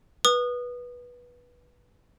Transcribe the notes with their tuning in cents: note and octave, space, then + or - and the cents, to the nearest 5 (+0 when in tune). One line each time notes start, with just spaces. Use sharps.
B4 -15 D#6 -25